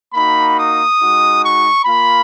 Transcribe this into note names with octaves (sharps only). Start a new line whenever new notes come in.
A#3 D#4 F#4 B5
D#6
G#3 D#4 F#4
C#6
A#3 F4 B5